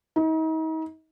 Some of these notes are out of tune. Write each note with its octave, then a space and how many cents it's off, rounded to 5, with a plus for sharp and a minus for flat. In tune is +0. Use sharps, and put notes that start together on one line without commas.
D#4 +40